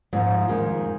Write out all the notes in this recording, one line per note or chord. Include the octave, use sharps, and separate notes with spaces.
G#2 F3 F#3
F2 D#3 G#3